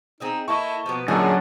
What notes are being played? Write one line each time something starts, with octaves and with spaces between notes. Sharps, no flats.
C4 D#4 G#4 E5
A#3 E4 A4 D#5 A5 C#6
B2 F3 A#3 B3
F#2 A#2 D3 D4 D#4 G#4